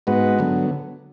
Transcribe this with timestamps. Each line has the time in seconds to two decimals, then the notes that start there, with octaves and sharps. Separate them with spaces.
0.07 G#2 G#3 B3 F#4 B4
0.39 D3 F#3 B3